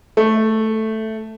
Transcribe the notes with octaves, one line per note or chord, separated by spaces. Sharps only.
A3